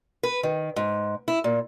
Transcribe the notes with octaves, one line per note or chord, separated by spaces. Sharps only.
B4
D#3
G#2
E4
A#2